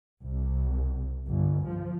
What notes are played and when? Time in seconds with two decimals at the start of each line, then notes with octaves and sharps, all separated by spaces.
0.23 C2
1.27 G1
1.66 F3